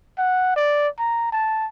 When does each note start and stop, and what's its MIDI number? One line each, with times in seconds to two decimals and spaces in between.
0.18 0.54 78
0.56 0.88 74
0.99 1.31 82
1.32 1.67 81